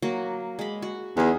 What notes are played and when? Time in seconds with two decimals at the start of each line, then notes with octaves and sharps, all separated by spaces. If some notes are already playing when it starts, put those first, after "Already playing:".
0.02 F#3 A#3 F#4
0.59 G#3 B5
0.82 F#4
1.17 E2 D#4 G#4